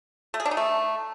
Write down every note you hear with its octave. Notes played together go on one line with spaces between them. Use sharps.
A3
G#4
D4
D#4
A3